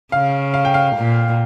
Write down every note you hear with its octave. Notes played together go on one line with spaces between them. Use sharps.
C#3 F5
F5
G5
F5
A#2